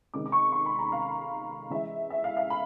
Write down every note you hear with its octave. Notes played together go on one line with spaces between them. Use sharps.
C3 D#3 G#3 C#4 D6
D6
C#6
C6
B5
A#5
F5
E3 G#3 C#4 E5
E5
F5
F5
B5